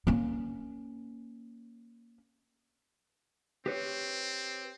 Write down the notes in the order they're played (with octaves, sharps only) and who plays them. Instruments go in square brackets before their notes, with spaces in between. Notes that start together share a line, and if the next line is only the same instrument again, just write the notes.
[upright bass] A#3 C#4
[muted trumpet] C4 [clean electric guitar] G4 B4 C#5